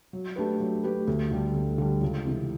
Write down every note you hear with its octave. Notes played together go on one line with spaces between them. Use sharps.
F#3
A3 D4 G4 B4
F#3
A3 D4 G4 B4
D2
D3 G3
D2
D3 G3
C#2
C3 E3